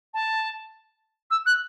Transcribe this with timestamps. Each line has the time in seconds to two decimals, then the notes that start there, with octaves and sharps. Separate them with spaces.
0.14 A5
1.30 E6
1.46 F#6